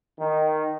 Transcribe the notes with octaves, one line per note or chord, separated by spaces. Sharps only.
D#3